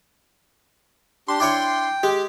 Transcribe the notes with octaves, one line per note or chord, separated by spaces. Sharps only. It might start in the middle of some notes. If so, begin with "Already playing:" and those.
D4 G4 C6
D4 E4 C#5 G5
G#3 G4